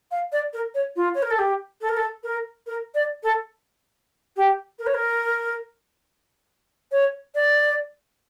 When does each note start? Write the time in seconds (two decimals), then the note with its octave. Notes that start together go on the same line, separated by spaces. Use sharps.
0.11 F5
0.32 D5
0.53 A#4
0.75 C#5
0.96 F4
1.15 C#5
1.22 A#4
1.31 A4
1.39 G4
1.81 A4
1.89 A#4
1.97 A4
2.24 A#4
2.67 A#4
2.94 D5
3.23 A4
4.36 G4
4.79 A#4
4.87 C#5
4.94 A#4
6.92 C#5
7.35 D5